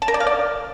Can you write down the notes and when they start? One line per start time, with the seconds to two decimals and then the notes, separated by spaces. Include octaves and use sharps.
0.02 A5
0.08 A#4
0.14 D5
0.20 F5
0.27 D5